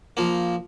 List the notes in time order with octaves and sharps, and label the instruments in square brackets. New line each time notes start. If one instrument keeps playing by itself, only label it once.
[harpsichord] F3 A#3